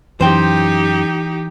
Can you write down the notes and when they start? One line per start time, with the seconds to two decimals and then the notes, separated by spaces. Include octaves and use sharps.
0.21 F#2 E3 D#4 G4 C5 G5